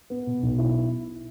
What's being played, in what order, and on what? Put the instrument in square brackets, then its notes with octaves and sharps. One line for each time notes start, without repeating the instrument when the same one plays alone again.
[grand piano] B3
B2
B1
E4